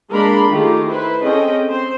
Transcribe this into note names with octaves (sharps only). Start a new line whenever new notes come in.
G#3 A#3 D4 A#4 B5 C6
D#3 A3 F4 G4 G#4
E4 B4 C5
C4 C#4 G#4 A4 D#5 G5
C4 C5